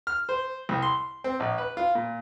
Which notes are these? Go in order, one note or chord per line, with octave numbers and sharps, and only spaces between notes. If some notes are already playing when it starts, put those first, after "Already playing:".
F6
C5
C2
C6
C4
A#1
B4
F4
A#2